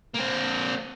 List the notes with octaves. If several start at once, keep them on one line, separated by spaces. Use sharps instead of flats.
A#3 C4